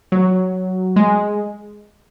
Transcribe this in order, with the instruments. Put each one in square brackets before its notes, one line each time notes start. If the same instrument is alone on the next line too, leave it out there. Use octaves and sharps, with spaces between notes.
[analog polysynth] F#3
G#3